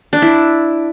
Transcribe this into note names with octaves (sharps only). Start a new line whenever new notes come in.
D4
E4